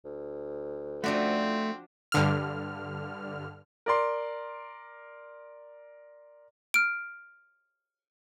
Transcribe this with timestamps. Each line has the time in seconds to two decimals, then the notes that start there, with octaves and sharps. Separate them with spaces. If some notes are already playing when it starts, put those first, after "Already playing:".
0.05 D2
1.04 F3 A3 C4 D4 F#4
2.12 G2 D3 F6
3.86 A#4 D5 C6
6.74 F6 D7